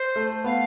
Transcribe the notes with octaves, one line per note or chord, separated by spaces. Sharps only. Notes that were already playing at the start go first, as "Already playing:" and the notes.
Already playing: C5
A3
B3 F5